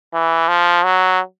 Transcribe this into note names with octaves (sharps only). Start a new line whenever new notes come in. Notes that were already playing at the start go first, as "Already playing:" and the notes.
E3
F3
F#3